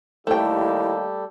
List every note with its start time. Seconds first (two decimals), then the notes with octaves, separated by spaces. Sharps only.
0.27 D#2 G3 A3 E4 G4 A4 G5